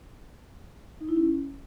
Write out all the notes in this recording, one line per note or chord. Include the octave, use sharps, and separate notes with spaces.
D#4
E4
C#4